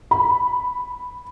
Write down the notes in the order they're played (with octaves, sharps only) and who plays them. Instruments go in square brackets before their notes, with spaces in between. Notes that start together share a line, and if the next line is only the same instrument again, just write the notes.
[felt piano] B5